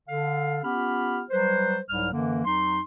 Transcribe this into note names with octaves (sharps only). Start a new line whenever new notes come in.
D3 A4 F5
B3 C#4 F4 G4 B5 F6
F#3 G3 B4 C5
C2 G#2 F#3 G3 F6
F#2 D3 E3 A#3
F2 F#3 D#4 C6